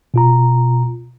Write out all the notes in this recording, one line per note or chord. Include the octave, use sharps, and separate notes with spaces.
B2 F4 A#5